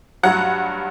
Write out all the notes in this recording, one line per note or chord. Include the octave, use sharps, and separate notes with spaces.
G2 F#3 F#5